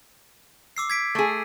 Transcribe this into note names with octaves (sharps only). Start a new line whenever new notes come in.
D6 E6 C7
G#6 B6 D7
A3 G#4